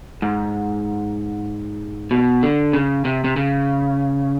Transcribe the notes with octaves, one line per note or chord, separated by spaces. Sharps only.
G#2
B2
D3
C#3
C3
C3
C#3